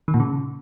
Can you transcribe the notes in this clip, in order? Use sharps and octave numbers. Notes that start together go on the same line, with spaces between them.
D#3
A#2
C#3